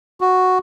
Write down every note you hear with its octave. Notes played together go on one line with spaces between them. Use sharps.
F#4